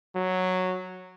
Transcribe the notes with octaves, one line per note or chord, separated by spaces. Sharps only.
F#3